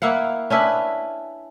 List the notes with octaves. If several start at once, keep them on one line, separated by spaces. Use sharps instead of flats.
A#3 E4 F5 F#5
C#4 D4 E4 B4